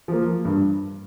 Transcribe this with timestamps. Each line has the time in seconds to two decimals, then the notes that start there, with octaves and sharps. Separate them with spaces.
0.08 F3 A#3
0.45 G2